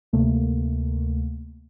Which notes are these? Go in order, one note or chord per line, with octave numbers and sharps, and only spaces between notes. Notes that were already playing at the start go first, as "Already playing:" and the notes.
D2 C3 A3 A#3